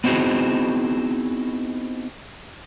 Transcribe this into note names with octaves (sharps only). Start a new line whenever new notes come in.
B3 C4 D#4 E4 F#4 G#4